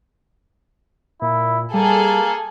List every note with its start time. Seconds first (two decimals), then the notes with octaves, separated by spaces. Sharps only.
1.22 A#2 E4
1.74 G3 A#3 G#4 A4